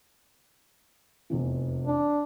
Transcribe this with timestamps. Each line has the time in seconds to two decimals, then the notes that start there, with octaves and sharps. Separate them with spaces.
1.30 F1 E2 E3
1.87 D4